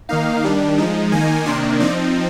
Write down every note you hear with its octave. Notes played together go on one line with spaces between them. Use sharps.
D#3 A#3 D#4 F5
D#3 G3 D4
F3 G#3 D#4
D#3 A#3 D#4 G#5
C3 D#3 A#3 D4 C6
F3 C4 D#4 D5